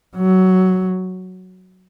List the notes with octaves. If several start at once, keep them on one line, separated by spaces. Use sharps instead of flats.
F#3